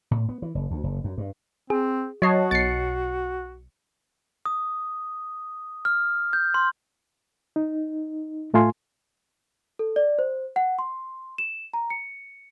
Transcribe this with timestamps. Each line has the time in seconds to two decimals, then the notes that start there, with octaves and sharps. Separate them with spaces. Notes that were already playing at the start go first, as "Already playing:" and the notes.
0.11 A2
0.29 B3
0.42 E3
0.55 F#1
0.71 D2
0.84 F#1
1.04 F#2
1.18 G2
1.70 C4 G#4
2.22 F#3 F#4 C#5 D#5 A5 C7
2.51 B1 A6 C7 C#7
4.46 D#6
5.85 F6
6.33 G6
6.54 C6
7.56 D#4
8.54 A2 A3 F4 G#5 C6
9.79 A4
9.96 D5
10.19 C5
10.56 F#5
10.79 C6
11.38 E7
11.74 A#5
11.90 C#7